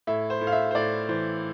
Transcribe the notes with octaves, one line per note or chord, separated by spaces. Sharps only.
A2 E5
C5
A2
F5
E5
C5
A2 D5
E3 C5